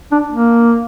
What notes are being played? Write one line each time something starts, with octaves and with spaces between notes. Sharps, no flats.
D4
A#3